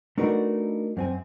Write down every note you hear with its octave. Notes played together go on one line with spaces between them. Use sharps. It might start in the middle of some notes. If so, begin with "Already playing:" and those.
A3 D4 D#4 F#4 A#4 B4
F#2 C4 G#5